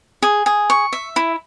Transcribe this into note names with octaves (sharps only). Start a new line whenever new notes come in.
G#4
G#4
C#6
E5
E4